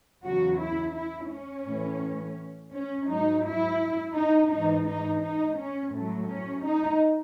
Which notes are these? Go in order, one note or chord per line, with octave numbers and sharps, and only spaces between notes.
E2 C#3 F#3 F#4
E4
E4
C#4
A2 E3
C#4
G#2 F#3 D#4
E4
D#4
G#2 E3 D#4
D#4
D#4
C#4
A2 F#3 A3
C#4
D#4